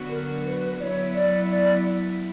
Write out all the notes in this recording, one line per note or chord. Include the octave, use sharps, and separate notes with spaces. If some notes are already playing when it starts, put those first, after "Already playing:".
Already playing: D3 F#3 B3 F#4
A#4
B4
F#3 B3 E4 C#5 D5
D5
D5